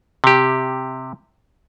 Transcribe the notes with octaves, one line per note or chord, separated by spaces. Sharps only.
C3 G4